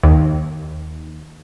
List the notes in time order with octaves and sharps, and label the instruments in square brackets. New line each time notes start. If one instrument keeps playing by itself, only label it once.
[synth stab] D#2